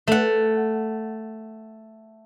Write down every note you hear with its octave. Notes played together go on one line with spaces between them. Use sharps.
A3 F#5